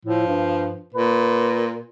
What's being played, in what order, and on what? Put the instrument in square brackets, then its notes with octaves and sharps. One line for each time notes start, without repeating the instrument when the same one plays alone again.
[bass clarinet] A2 [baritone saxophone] F3
[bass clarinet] G2
[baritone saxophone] A#2 [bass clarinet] B4